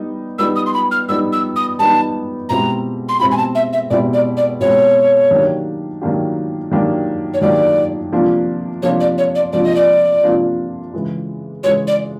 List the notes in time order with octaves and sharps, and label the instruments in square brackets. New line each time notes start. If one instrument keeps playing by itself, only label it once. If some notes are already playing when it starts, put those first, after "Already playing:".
Already playing: [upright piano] G3 B3 D#4
[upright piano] G3 B3 D#4 [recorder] E6
[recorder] D#6
C6
B5
F6
[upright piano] G3 B3 D#4 [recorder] E6
[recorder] E6
D#6
[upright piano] G3 B3 D#4 [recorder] A5
[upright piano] B2 G#3 C4 E4 G4 [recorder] A#5
[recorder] C6
[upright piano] B2 G#3 C4 E4 G4 [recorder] B5
[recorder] G#5
A5
E5
E5
[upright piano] B2 G#3 C4 E4 G4 [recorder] D5
[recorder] D5
D5
[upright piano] B2 G#3 C4 E4 G4 [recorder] C#5
[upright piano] D#3 F#3 A#3 D4 G4
D#3 F#3 A#3 D4 G4
D#3 F#3 A#3 D4 G4
[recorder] C#5
[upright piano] D#3 F#3 A#3 D4 G4 [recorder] D5
[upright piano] C3 F3 A#3 D4 F4
[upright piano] C3 F3 A#3 D4 F4 [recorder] C#5
[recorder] D5
C#5
D5
[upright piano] C3 F3 A#3 D4 F4 [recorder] D5
[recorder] D#5
D5
[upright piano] C3 F3 A#3 D4 F4
C#3 E3 G#3
[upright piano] C#3 E3 G#3 [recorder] C#5
[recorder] D5